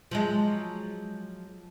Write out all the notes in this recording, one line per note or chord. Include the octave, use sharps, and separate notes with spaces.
F3 F#3 G#3